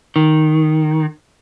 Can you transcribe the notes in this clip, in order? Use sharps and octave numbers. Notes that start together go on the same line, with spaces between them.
D#3